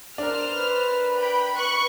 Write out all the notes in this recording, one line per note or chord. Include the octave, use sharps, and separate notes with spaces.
D4 A#4 C5 F6
B4
G5 B5
B4 C#6 F#6